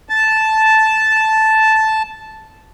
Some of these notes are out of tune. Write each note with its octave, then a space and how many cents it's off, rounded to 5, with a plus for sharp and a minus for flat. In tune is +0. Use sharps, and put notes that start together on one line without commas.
A5 -5